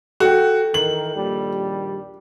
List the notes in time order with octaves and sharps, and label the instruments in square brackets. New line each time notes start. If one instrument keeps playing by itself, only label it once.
[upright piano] F#4 [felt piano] A4 G5
[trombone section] D#3 E3 A#4 [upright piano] F#7
[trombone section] A#1 D#2 G3